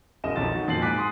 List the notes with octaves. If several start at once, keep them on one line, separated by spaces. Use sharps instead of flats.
E1 D#5 E7
B1 F2 D#3 A6
D#4 F#4
F2 A#2 A6 C7 F#7
G#2 G#5 D6 F#6 B6
C6 D#6